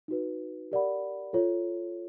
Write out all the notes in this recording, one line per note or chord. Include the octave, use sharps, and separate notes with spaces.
D#4 F#4 B4
G4 A#4 D5 F#5 B5
F4 A4 C#5